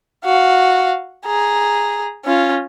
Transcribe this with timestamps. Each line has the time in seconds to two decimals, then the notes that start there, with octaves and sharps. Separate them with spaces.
0.25 F#4 F5
1.26 G#4 A#5
2.25 C#4 F4